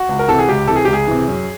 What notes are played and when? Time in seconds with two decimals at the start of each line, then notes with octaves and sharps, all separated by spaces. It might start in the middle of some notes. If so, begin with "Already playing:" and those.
Already playing: F#4
0.09 C#2
0.19 A#4
0.28 C3 E3 A4
0.39 G#4
0.49 C#2 G4
0.67 C3 E3 A4
0.76 G#4
0.85 C#2 G4
0.93 G#4
1.07 C3 E3
1.28 F#2